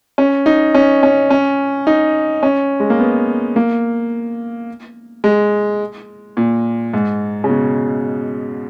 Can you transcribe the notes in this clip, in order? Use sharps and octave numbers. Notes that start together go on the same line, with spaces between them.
C#4
D#4
C#4
C#4
C#4
D#4
C#4
G#3
A#3
B3
A#3
G#3
A#2
G#2
C#3
B2